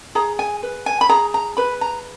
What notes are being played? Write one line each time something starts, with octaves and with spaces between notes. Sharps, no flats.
G#4 A#5
G#5
B4
G#5
B5
G#4 A#5
A#5
B4 B5
A#5